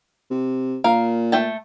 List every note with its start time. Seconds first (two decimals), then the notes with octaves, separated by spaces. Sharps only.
0.30 C3
0.84 A#2 A#4 F5
1.32 A3 G5 A5